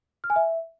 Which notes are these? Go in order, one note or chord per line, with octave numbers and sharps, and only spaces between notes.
F6
G#5
E5